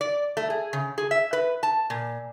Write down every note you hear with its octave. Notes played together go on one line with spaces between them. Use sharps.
D5
A3
G#4
C#3
G#4
E5
B4
A5
A#2